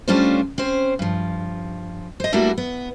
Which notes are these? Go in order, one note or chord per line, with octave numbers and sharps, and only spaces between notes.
G3 A3 C#4 D4 F4 C5
C4 C#4 C5
G2 F3
C5 D#5
G3 A3 A#3 D4 E4 F#4
B3